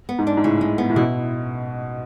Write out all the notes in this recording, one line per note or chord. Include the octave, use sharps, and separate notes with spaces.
B3
G#2
D4
G#2
A2 C#3
G#3
B3
A2
B2 E4